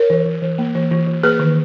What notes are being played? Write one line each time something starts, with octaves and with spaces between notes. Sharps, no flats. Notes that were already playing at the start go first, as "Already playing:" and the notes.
Already playing: A#4 C#5
E3
E3
E3
A#3
E3
E3
E3
A#3 G#4 B4
D#3